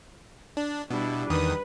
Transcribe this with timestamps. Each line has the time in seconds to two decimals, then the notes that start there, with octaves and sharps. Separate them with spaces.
0.57 D4
0.91 B2 G3 D4 E4
1.30 E2 D#3 B4 D#6